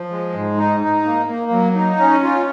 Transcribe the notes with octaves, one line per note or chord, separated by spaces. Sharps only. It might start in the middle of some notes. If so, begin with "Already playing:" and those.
Already playing: F3
G#3
G#2
D#4
D#4
A#3
A#3
F#3
D#4
C#4
F4